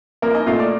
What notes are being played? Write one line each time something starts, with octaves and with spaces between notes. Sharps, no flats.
A#1 A#3 A#4
D#4 D#5
A#2 A3 F4 F5
D5 D6